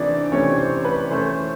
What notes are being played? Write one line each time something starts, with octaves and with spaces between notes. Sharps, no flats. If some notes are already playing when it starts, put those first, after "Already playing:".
Already playing: C3 E3 A3 C4 D4 D#4 D5
C3 E3 A3 C4 C#4 C#5
C5
B4
E3 A3 C#4 C5